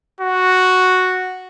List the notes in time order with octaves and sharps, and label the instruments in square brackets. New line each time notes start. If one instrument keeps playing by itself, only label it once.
[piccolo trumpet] F#4